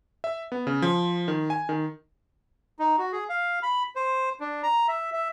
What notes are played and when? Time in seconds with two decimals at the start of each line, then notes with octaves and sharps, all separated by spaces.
0.24 E5
0.52 B3
0.67 C#3
0.82 F3
1.28 D#3
1.50 G#5
1.69 D#3
2.79 D#4
2.98 F#4
3.12 G#4
3.29 F5
3.63 B5
3.96 C5
4.40 D4
4.63 A#5
4.88 E5
5.13 E5